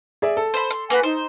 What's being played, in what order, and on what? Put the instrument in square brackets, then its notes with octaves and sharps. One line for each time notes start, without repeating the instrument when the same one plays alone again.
[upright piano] G#4 D5 E5
A4
[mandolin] C5 B5
C6
[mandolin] A#3 F#4 [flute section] B4 G#5
[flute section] D#4 [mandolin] C5